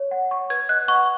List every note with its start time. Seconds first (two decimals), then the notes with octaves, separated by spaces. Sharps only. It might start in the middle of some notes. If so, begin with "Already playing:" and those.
Already playing: C#5
0.11 F#5
0.31 C#6
0.50 B4 G#6
0.69 D#5 F#6
0.88 F#5 C#6